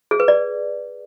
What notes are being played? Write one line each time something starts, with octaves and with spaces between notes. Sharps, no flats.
G#4
B4
D5